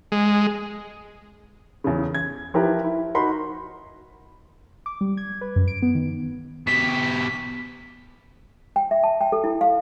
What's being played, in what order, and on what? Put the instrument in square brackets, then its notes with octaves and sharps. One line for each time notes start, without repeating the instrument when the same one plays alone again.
[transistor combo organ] G#3
[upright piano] E2 C#3
G#6
F3 E4 G4 A#4 B4
E4
D#4 F#4 A#4 B5 C6
[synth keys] D6
G3
G#6
B4
F#2
D7
B3
D#3
[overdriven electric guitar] B2 G4 [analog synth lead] B6
[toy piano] G5
E5
A5
G5
A4
E4
F5